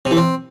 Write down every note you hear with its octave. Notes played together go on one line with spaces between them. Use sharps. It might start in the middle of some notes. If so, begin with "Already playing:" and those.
C3
E3
C4